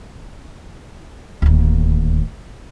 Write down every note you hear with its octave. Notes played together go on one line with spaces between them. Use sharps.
D1 D#2